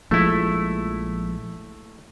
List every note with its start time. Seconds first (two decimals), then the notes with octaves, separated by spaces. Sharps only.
0.11 A#1 F3 G#3 A3 E4